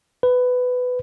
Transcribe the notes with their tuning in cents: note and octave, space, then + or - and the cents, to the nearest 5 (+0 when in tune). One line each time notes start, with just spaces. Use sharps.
B4 +15